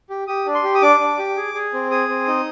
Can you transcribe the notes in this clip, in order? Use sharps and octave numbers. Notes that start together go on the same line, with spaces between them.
G4
G4 D#6
D4
C6
G4
D#6
D4 D6
D4
G4
G#4
G#4
C4
G#4 D#6
C4
D#4